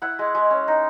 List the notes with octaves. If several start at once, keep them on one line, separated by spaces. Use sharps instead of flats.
E4 F#5
G#3
G#3
C#4
D#4